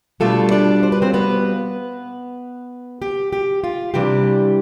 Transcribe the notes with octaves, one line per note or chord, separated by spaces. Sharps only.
B2 G3 A3 D4 F4 A4
D4 D5
C5
B4
C4 C5
B3 B4
G4
G4
F4
C3 E3 G3 D4 G4